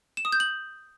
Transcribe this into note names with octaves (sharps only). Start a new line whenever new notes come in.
E7
D#6
G6
F#7